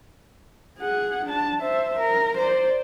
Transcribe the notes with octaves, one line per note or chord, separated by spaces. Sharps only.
G#4 F#5
D4 A5
C5 E5
A#4
C5 D5